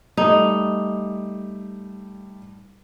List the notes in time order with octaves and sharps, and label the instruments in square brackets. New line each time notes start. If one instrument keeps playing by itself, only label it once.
[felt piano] G3 A3 [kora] D#4